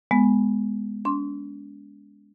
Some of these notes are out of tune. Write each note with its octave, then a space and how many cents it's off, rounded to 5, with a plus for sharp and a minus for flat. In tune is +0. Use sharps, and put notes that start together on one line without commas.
G#3 +0 B3 +0
D4 -40 C6 +0